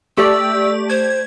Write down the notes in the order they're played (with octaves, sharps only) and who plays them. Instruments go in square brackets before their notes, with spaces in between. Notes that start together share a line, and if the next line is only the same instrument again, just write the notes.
[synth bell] A3 G4 D5 [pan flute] E6
[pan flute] C5 [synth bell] G#6